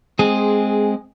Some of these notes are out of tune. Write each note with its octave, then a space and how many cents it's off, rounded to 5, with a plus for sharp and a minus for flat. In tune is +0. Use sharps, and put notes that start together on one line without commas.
G#3 +10 C4 +0 G#4 -5